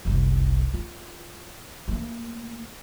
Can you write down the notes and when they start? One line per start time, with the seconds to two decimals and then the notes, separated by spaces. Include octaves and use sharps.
0.05 F#1 C2
0.74 F4
1.88 A3 A#3